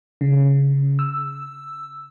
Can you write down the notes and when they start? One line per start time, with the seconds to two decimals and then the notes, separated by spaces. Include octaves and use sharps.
0.21 C#3
0.99 E6